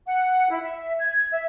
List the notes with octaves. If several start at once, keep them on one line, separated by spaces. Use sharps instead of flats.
F#5
E4
E5
G#6
E5